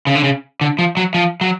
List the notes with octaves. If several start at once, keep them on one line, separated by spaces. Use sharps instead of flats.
C#3
D3
C#3
D3
F3
F#3
F3
F#3